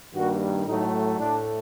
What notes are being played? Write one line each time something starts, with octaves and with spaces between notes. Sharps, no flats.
G2 D#3 G3 A#3 F#4
A2 F#3 A3 D#4
A2 A3 D4